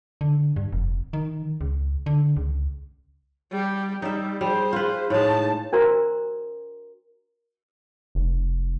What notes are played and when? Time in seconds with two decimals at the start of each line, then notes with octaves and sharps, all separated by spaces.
0.21 D3
0.56 G2
0.73 F1
1.13 D#3
1.61 C#2
2.06 D3
2.37 C#2
3.51 G3 G4
4.02 G3 D#4 E5
4.41 G3 G#4 C5
4.73 F4 B4
5.10 A2 G#3 D#4 A5
5.73 D4 F#4 A#4 C5 A#5 C6
8.15 F1